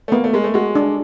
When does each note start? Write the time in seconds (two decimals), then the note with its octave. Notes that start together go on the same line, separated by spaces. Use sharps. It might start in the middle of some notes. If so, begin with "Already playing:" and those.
0.08 A3
0.12 A#3 B3
0.24 A3
0.33 G#3 A#4
0.44 A3
0.54 G#3 F#4
0.75 D4